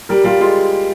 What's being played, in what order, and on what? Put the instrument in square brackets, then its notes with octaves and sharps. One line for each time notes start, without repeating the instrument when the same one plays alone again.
[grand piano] G3 [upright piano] A#4
[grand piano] G3 [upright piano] F4
[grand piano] G#3 [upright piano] F4